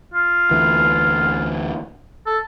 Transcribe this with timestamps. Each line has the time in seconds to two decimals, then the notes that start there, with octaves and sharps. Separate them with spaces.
0.14 F4
0.51 D2 E3
2.27 A4